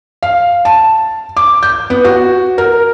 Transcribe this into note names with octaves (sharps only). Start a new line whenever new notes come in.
F5
A5
D6
G6
B3
F#4
A#4